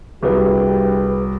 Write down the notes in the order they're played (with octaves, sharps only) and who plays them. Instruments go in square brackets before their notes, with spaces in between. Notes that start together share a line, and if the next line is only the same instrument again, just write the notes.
[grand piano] C2 F#3 [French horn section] G2 G4 [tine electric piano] G#4 B4